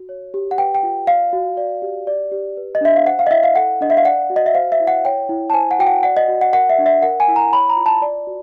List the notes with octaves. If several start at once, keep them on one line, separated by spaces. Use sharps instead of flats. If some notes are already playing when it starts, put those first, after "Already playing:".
Already playing: F#4
C#5
G4
F#5
B4 G5
G5
F4
D5 F5
F#4
D5
G4
D5
G4
B4
D#5
D4 E5
F5
C5 F#5
F5
D#5
E4 E5
F5
A4 F#5
D4 D#5
E5
F5
D5 F#5
F#4
D#5
E5
C5 F5
E5
E4
F#5
C#5 G5
E4
A5
C5 G#5
F#5
F#4 G5
F#5
D5 F#5
D#5
F#4
F#5
A#4 F#5
E5
D4
E5
A#4 F#5
G#5
E4
A#5
C#5 B5
A#5
F4
A5
D5
F#4